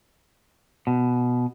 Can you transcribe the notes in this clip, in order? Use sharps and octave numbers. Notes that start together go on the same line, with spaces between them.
B2